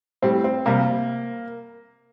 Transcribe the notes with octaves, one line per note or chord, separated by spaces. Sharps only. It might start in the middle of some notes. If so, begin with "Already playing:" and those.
A2 G3 C4
C4
C3 G3 A#3